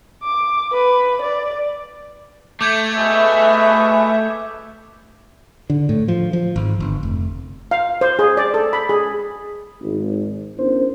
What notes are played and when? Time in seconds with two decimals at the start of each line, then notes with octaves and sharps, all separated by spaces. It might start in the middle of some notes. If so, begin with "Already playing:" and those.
0.23 D6
0.72 B4
1.21 D5
2.61 A3 D6 G6 G#6
2.96 B2 G#4 B4 E5
5.70 D3
5.89 A2
6.08 F3
6.33 F3
6.56 G#1
6.80 G1
7.03 F1
7.71 F5
8.01 C5
8.19 G#4
8.37 D5
8.54 A4
8.73 B5
8.89 G#4
9.81 G#1
10.58 B3 C#4 D4 E4 A#4 C5